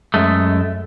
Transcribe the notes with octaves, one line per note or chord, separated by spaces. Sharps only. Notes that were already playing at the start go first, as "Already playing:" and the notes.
F#2 G#3 A3